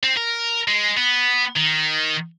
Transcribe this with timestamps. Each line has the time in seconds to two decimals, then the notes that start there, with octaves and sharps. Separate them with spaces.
0.03 C4
0.17 A#4
0.68 G#3
0.97 B3
1.56 D#3